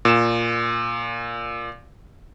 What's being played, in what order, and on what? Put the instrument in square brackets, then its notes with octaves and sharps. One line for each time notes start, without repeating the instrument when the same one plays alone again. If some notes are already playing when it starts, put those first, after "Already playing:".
[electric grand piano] A#2 E7